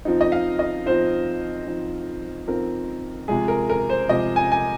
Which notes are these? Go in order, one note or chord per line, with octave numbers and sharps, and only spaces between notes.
F3 C4 D#4
D#5
F5
D#5
F3 C4 D#4 C5
F3 C4 D#4
F3 C4 D#4 A#4
C3 F3 G#3 G#4
A#4
A#4
C5
C3 F3 G#3 D#5
G#5
G#5